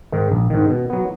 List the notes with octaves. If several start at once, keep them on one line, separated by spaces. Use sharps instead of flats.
G#2 D#3
A#1
G#2 D#3
B2
F#3 B3